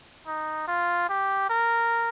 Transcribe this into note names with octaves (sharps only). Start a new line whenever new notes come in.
D#4
F4
G4
A#4